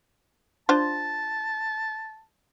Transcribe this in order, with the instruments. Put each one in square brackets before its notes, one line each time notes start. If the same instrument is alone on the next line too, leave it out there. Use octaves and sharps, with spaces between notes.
[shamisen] D4 F4 C5 [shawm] A5